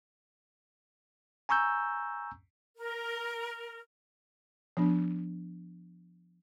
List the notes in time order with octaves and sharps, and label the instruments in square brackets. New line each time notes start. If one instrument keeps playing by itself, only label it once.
[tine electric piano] G#5 A#5 C#6 E6 G6
[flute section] A#4
[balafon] F3 B3 D4